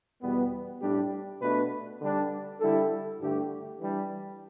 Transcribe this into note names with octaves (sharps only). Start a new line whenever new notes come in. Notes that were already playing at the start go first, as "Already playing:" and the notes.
E2 B2 G3 B3
A2 G3 D4 G4
B2 A3 D4 B4
D3 G3 D4
D3 G3 E4 A4
G2 D3 A3 G4
E3 G3 D4